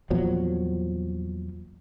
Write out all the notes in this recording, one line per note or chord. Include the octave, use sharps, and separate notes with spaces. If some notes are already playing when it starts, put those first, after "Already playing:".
E2 A#2 F3 F#3